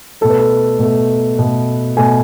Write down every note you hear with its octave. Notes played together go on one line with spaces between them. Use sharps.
B2 A3 A4
B4
A4
B2 A3
B2 A3
B2 A3 G#5